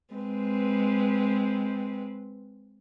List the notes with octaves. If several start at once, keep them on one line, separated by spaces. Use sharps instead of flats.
G#3 C4 B4